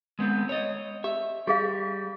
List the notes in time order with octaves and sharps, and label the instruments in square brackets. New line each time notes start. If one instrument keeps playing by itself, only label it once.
[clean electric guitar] G#3 B3 C4
C#5 D#5
[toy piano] G4 [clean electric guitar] E5
[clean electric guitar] G3 [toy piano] G4 G#4 F5